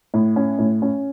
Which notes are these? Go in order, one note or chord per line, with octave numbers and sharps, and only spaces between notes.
A2
C#4
A2
C#4